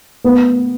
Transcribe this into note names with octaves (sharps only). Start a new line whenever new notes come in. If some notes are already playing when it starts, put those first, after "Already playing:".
B3